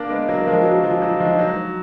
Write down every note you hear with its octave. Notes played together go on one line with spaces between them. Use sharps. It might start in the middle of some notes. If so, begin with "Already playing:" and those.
Already playing: A#3 D4
G#3 B3
F#3 A#3 A#4
F3 G#3
F4
F#3 F#4
F3 F4
F#3 F4
F3 G#3 D#4
F#3 D#4